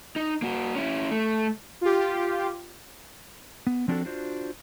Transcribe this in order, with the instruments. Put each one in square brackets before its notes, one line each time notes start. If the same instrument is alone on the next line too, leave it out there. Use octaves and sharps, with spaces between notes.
[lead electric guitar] D#4
A#3 F#4
C#4 E4
A3
[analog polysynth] F4 G4
[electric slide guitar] B3
F3 C4 D4 F#4 G4 A4
D4 F4 F#4 C5